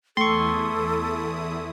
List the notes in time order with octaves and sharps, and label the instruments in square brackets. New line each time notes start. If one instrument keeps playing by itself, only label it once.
[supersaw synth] E2 E4 D#6 [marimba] A3 [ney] A4 [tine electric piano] C6 C#6